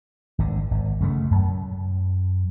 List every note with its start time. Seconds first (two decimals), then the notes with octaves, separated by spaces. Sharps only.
0.39 G#1 D3
0.71 G#1
1.00 F#2 C#3 A3
1.31 F#2